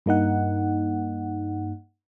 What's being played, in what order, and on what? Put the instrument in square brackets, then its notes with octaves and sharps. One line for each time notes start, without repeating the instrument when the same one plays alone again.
[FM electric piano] G2 A#3 D#4 F#5